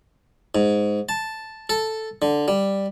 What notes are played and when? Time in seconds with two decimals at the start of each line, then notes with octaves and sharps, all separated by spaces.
0.55 G#2
1.09 A5
1.69 A4
2.22 D3
2.48 G3